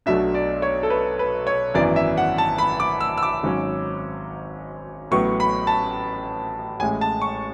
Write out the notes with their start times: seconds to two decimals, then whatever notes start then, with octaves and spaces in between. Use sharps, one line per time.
0.06 B1 B2 F#3 A3 D4 E5
0.34 D5
0.62 C#5
0.83 A4
0.90 B4
1.19 B4
1.47 C#5
1.74 G#1 F#2 E3 B3 D5
1.96 E5
2.18 F#5
2.38 A5
2.58 B5
2.80 D6
3.01 E6
3.18 E6
3.23 D6
3.43 G#1 G#2 F#3 C#4
5.11 A1 A2 F#3 B3 C#6
5.40 B5
5.67 A5
6.80 A1 A2 G#3 G#5
7.01 A5
7.22 C#6